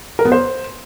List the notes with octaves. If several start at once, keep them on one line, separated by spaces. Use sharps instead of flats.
A#4
B3
C5